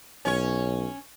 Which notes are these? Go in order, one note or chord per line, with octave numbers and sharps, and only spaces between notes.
B1 C#4 C#5